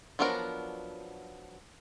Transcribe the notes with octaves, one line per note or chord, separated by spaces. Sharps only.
F3 F#3 B3 D4 A#4